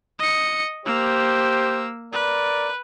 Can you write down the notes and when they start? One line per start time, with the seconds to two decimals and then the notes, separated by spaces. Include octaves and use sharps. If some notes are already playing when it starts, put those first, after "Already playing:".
0.19 D#5 C#7
0.86 A#3 G4 C5 E6
2.13 A#4 B4 D5